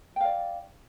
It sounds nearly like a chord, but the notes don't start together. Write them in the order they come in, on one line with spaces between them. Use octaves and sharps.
G5 F5 D5